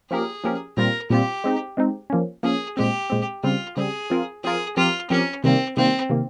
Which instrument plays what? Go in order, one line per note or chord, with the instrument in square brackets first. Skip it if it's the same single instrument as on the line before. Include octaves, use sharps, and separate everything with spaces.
[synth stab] F3 A#3 C#4 G4 A#4 [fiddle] G#4
[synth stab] F3 A#3 C#4 G4 A#4
[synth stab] A#2 G3 C4 F4 [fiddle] A#4
[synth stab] A#2 G3 C4 F4 [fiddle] G4
[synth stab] G#3 C4 D#4
G#3 C4 D#4
F3 A#3 C#4
[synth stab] F3 A#3 C#4 [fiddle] G#4
[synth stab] A#2 G#3 C4 [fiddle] G4
[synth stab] A#2 G#3 C4
[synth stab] C#3 G3 C4 [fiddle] F4
[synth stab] C#3 G3 C4 [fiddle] G#4
[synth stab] F3 C4 F4 A#4
[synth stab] F3 C4 F4 A#4 [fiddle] G#4
[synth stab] F3 C4 G4 A#4 [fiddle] F4
[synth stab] F3 C4 G4 A#4 [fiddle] C#4
[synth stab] C3 D#3 G3 A#3 [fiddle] C4
[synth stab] C3 D#3 G3 A#3 [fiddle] C4
[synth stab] C3 D#3 A#3